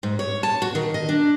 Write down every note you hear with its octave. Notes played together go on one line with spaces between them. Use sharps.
G#2
C#5
A5
F#4
D#3
D#5
D4